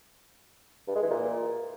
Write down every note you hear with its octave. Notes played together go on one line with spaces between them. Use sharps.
G2
G#3
E3
A#2